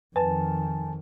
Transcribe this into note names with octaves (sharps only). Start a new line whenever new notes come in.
F2 D#3 B4 G#5 A5